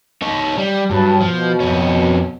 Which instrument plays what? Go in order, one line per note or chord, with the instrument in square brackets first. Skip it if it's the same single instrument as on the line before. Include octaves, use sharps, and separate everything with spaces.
[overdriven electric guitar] D#4 C#5
G3
[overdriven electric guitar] G2 [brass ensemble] F#3 B4 A5
[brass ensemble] B2 [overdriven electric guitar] F3
[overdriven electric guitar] F2 C#4